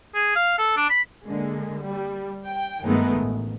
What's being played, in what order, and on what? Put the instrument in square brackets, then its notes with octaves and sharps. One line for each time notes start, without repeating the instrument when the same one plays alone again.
[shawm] G#4
F5
A4
D4
B5
[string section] D3 G#3 A#3
G3
G5
G2 D#3 G#3 A3 B3 D#4
A1